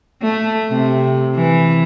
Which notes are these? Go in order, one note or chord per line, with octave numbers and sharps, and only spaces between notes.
A3
C3
E3